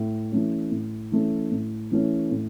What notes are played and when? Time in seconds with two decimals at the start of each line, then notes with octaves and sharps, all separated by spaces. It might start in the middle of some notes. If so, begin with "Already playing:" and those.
Already playing: A2
0.32 E3 A3 C#4
0.72 A2
1.12 E3 A3 C#4
1.52 A2
1.91 E3 A3 C#4
2.31 A2